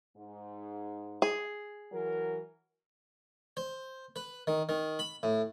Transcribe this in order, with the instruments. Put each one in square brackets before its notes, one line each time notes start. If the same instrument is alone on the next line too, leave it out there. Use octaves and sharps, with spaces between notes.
[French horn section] G#2
[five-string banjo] G#4
[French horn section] E3 F#3 A#4
[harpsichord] C5
B4
D#3
D#3
B5
A2